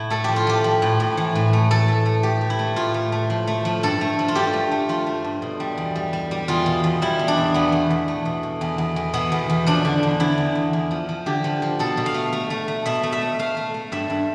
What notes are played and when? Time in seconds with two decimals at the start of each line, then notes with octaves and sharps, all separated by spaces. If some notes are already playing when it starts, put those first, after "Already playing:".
Already playing: A2 E4
0.10 A3 A4
0.24 F3 G4
0.36 F4
0.47 F3 G4
0.64 F3
0.82 A2
1.00 A2
1.17 E3
1.35 A2
1.53 A3
1.70 A3 A4
1.88 A3
2.05 A3
2.23 A2 G4
2.41 A3
2.50 E4
2.59 A3
2.76 A2 F4
2.94 A3
3.12 A3
3.30 F3
3.47 A3
3.65 F3
3.83 G2 A4
4.01 A3
4.19 F3
4.28 F4
4.35 G2 G4
4.53 A3
4.71 A3
4.89 F3 F4
5.07 A3
5.24 G2
5.42 B2
5.60 G3
5.78 E2
5.95 G3
6.13 G3
6.31 G3
6.48 E2 F4
6.66 B2
6.84 E2
7.02 G3 E4
7.19 E2
7.28 D4
7.37 B2
7.54 E2 B3
7.72 A3
7.90 E2
8.08 A3
8.25 B2
8.43 B2
8.61 E2
8.78 E2
8.96 E2
9.13 B2 B3
9.32 E2
9.49 E2
9.66 F3 D4
9.85 D3
10.03 E2
10.20 D3 E4
10.38 E2
10.55 E2
10.73 E2
10.91 F3
11.09 F3
11.26 D3 G4
11.44 F3
11.62 F3
11.79 B2 A4
11.97 B2
12.06 F5
12.14 A3
12.33 A3
12.50 A3
12.68 A3
12.86 B2 E5
13.03 A3
13.12 E5
13.21 A3
13.39 A3 F5
13.57 A3
13.74 A3
13.92 G2 E5
14.10 G2